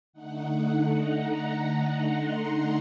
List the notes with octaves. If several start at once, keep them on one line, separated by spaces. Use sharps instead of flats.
D3 A3 D#4 F#5
A#5
A#5
C6
A#5